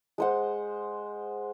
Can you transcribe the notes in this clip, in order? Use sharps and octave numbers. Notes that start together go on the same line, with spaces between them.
G#3 C5 F#5